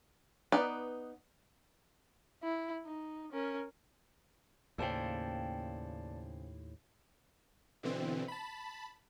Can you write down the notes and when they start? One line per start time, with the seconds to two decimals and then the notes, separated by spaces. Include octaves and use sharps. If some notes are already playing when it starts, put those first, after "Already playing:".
0.52 B3 D#4 B4 D5
2.43 E4
2.86 D#4
3.32 C#4 A#4
4.78 D#2 A2 C#3 A#3 C5 D5 G5 A5
7.83 B2 D3 E3 C4
8.28 A5 B5